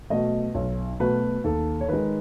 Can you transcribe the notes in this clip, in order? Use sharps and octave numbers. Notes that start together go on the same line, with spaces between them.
B2 F#3 A3 D#5
B1 C#5
B2 F#3 A3 B4
D#2 A4
C#5
D#3 G#3 B4